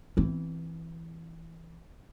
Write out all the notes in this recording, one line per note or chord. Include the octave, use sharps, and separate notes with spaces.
E3 C4